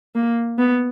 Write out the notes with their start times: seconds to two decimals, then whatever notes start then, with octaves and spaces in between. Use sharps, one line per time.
0.15 A#3
0.58 B3